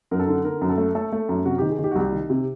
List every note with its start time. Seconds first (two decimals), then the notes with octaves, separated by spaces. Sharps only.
0.11 F#2 A#4
0.20 A4
0.27 D3
0.45 D3 A#4
0.61 F#2
0.69 A4
0.78 A3
0.95 A3 A4
1.13 A3
1.29 F#2
1.45 C3 F#4
1.58 D#3 G4
1.71 G#4
1.79 D#3
1.84 G4
1.91 F#4
1.95 C2 G4
2.12 D#3
2.30 C3